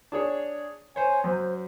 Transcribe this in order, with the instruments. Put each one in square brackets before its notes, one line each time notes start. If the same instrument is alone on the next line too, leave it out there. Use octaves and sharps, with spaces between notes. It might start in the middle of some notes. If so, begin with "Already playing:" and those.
[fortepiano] D4 G#4 C#5
[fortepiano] C5 C#5 [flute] G#5
[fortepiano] F#2 [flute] C5